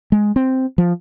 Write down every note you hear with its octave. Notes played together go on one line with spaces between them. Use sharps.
G#3
C4
F3